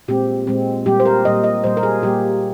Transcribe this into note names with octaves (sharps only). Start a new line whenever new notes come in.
A#2 G#3 C4 G4
A#2 G#3 C4
A#2 G3 A#3 G4
C5
A#4
A#2 G3 A#3 D#5
D#5
A#2 G3 A#3 C5
A#4
G#4
A#2 G3 A#3 G4